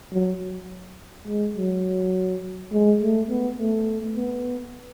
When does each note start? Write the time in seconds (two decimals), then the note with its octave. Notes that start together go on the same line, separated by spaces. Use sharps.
0.12 F#3
1.27 G#3
1.57 F#3
2.72 G#3
3.01 A3
3.30 B3
3.59 A3
4.16 B3